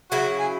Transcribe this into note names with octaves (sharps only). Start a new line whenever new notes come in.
C#3 F#3 E4 F#4
G#4